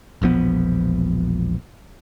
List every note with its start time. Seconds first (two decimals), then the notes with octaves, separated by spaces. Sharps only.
0.22 E1 A#1 F3 B3